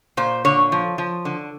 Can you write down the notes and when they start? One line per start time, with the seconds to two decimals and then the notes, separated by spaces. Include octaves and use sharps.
0.17 A#2 C5
0.45 D3 C#5
0.72 F3
0.98 F3
1.25 D3